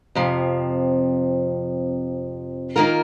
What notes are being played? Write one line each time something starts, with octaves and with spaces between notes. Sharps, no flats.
F2 C3 F3
D#3 A#3 F4 A#4